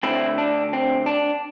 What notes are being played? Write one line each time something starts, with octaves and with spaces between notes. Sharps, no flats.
D3 A3 C4 E4
D4
C4
D4